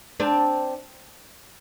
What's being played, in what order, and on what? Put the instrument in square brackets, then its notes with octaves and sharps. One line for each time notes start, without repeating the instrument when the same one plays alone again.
[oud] C4 D4